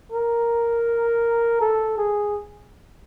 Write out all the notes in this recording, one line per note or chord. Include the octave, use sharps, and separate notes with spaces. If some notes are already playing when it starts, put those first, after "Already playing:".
A#4
A4
G#4